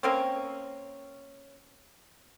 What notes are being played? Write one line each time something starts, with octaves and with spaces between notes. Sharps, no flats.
A#3 C4 C#4